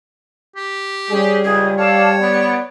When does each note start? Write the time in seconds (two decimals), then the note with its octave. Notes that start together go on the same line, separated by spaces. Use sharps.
0.56 G4
1.11 G3 C#4 G#4
1.44 C#2 G#4
1.78 A4 C#5 D5 F5 A5
2.20 B3 D5